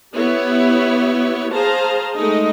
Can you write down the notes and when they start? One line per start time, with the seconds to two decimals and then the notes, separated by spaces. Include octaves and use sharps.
0.15 B3 E4 G4 C#5
1.53 G#4 C5 F5 A5 A#5
2.16 G#3 A3 D#4 D#5